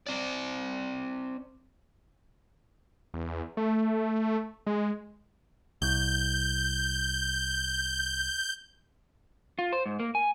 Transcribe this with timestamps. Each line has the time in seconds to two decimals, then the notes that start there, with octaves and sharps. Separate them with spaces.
0.07 C4 D5
3.14 E2
3.57 A3
4.67 G#3
5.82 C2 G6
9.59 F4
9.73 C5
9.86 G#2
10.00 A#3
10.15 G#5